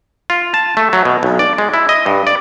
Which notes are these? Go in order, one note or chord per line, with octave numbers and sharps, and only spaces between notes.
F4
A5
A3
F#3
B2
B1
D5
G#3
E4
D#5
G2
D5